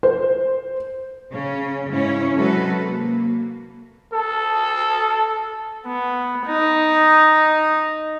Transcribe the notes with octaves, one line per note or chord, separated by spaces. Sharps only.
C5
C#3 C#4
G#2 C#3 C#4 E4
C3 F#3 G#3 F#4 A4 B4
A#3
A4
B3
D#4